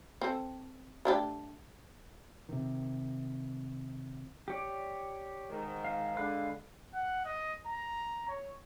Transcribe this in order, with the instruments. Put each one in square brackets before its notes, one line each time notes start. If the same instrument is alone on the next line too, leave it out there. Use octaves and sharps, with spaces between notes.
[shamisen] C4 A4
A3 D4 G4
[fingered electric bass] C3 D#3
[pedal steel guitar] G4 C#5 D5
[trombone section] G#2 D#3
[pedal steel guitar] F5
[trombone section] D3 G#3 [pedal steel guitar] F5 B5 F#6
[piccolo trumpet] F#5
D#5
A#5
C#5